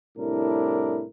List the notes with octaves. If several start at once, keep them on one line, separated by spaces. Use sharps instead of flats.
C2 A2 D4 E4 A#4